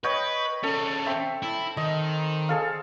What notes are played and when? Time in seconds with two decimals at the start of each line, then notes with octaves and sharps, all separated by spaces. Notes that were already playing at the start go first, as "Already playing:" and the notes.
0.04 B4 C#5 D#5 G5
0.63 D3 C#4 A4
1.06 C4 E5 E6
1.42 E4
1.77 D#3 D#5
2.49 G#4 A4 F5